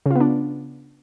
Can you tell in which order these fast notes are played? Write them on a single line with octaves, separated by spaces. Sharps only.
C#3 F4 B3 D4